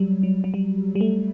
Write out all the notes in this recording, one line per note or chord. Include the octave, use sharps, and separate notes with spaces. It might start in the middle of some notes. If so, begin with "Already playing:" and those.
Already playing: F#3 G3
F#3
F#3
G3
G3
A3